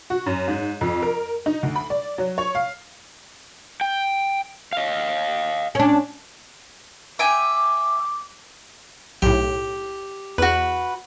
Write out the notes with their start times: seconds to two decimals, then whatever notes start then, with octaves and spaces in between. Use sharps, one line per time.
0.10 F#4
0.26 F#2
0.48 G#2
0.81 F2
1.02 A#4
1.46 D#4
1.63 D2
1.75 B5
1.90 D5
2.18 F#3
2.38 C#5
2.55 F5
3.81 G5
4.73 D#5 F5
5.75 C#4 D4
7.19 E5 G5 G#5 D6
9.22 B1 A2 G4
10.38 E2 F#4 B4